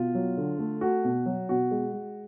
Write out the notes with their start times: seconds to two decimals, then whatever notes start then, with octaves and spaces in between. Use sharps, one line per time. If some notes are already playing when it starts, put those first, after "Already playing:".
Already playing: B2 F4
0.15 F#3
0.37 D3
0.59 A3
0.81 A3 F#4
1.04 B2
1.26 F#3
1.49 B2 F#4
1.71 G#3
1.93 G#3